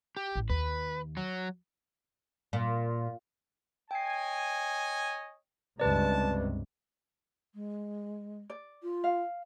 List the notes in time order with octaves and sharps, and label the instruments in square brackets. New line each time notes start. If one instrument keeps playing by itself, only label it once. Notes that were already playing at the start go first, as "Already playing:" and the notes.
[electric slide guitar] G4
[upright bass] A1
[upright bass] D#2 [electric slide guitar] B4
[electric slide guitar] F#3
[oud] A#2
[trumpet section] C#5 D#5 G#5 [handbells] G5 C7
[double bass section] C#2 G2 C3 [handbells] B4 D5 [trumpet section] A5
[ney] G#3
[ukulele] D5
[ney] F4
[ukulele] F5